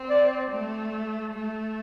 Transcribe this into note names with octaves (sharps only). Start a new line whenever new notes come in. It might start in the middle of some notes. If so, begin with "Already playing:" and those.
Already playing: C4
D5
A3
A3